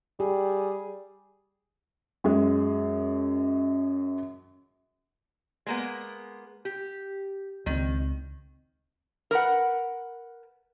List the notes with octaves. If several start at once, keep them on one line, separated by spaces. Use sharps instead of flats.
G3 G4 G#4
F#2 G#3
G#3 A#3 B3
G4
C#2 D#3 F#3 C4
A#4 B4 F#5